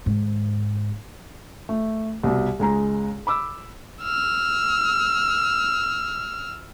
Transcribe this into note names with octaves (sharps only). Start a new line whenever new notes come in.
G#2 D#3
A3
C2 B2
C#2 G#3 A#5
B5 D6 E6
E6 F6